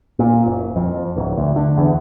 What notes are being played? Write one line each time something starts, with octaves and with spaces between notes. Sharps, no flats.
A#2
F#1
F2
D1
D2
D3
E2